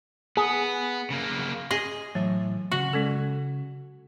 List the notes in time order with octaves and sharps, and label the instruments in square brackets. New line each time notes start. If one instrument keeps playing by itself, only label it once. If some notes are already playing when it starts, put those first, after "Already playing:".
[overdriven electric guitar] B3 [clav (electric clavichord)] G#4
[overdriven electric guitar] C#3 A#3
[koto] G#4 D#5
[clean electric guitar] A2 E3 E5 [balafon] F#3
[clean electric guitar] C#3 [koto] F#4
[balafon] G#3 C#4 A4